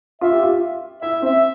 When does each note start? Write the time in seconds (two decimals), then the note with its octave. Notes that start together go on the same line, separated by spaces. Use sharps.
0.21 F4 E5
0.32 G4
0.43 F4
1.02 E4 E5
1.22 C4
1.25 E5